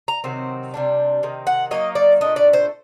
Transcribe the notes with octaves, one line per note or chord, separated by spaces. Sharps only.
A#5
C3 D#3 F#3 C4
C3 G3 D4
C3 D#3
F#5
F#3 A#3 D#4 D#5
D5
A#2 A3 D4 D#5
D5
C5